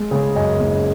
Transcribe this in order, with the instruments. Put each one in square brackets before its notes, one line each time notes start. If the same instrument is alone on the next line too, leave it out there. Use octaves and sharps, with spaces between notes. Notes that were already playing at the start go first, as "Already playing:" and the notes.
Already playing: [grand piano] G#3
C#3 G#4
F#2 D#5 G#5
F#1